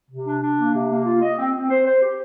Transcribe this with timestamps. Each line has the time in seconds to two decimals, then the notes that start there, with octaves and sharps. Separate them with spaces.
0.10 C3
0.26 D4
0.43 D4
0.58 A#3
0.75 C3
0.90 A#3
1.06 F4
1.22 D#5
1.39 C4
1.54 C4
1.69 C5
1.86 C5
2.02 G4